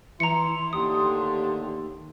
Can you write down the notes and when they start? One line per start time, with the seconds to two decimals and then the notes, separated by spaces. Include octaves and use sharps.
0.20 E3 E4 A#5 C6 C#7
0.73 D#2 A2 D3 G4 D#6